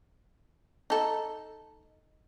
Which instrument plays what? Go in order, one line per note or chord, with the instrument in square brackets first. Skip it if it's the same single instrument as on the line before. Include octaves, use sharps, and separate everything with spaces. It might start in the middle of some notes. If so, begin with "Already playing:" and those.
[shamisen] D#4 A4